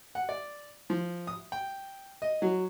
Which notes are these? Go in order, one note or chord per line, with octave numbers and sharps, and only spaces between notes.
F#5
D5
F3
D#6
G5
D#5
F#3